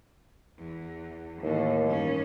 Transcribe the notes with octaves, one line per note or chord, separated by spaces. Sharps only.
E2
D#2 A2 E3
G2 C#4